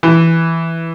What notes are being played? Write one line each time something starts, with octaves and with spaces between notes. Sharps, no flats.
E3